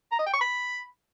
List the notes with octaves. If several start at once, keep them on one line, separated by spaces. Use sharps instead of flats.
A#5
D#5
G5
C#6
B5